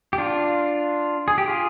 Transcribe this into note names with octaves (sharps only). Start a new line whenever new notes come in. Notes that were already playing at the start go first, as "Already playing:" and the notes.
G4
D4 F4
G#4
G4
F4 G#4